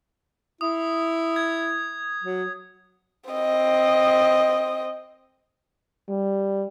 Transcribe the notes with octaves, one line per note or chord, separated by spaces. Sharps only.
E4 D#6
G#6
F#3
C4 D#5
G3